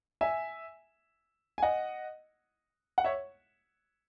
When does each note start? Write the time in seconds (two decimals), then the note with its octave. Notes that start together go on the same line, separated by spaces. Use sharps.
0.21 E5 G#5
1.58 G#5
1.62 D#5 F#5
2.98 F#5
3.04 C#5 E5